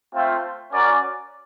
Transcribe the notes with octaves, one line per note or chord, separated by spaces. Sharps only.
A3 C4 F4
C#4 F#4 A#4 D5